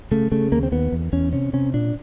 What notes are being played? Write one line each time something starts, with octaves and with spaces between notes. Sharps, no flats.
C#3 A3
C#3 A3
D#2 A#3
C4
D#2 B3
E2
E2 C#4
C3 C#4
C3 C#4
A#2 D4